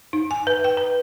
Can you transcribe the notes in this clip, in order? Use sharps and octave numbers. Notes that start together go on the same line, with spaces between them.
D#4
G#5
B4
G5
B4